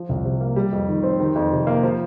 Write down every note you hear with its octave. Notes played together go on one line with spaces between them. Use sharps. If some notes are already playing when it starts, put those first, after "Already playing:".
Already playing: F3
C2
C3
A#3
G3
F2
D#3
C4
D#3
F2
C3
A#3
F3